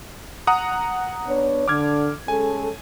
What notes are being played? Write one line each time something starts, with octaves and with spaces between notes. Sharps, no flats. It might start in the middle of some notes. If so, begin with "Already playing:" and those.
F#5 A#5 D#6
B3 D4 C#5
D3 D6 F6 G#6
G#3 C#4 A4 G#5